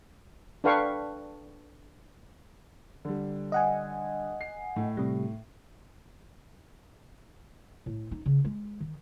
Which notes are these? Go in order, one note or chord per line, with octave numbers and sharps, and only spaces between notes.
D4 A4 B4 F5 G5 C#6
D3 G3
D#5 F#5 G#5
C7
A2
C3 G3
A2
D#4
C#3
G#3
D#3